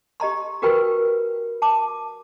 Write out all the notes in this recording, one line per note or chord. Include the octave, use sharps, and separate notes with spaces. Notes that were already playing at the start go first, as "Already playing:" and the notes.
G4 D#5 A#5 C6
F#4 G4 A#4 B4 G5 B5
A5 D6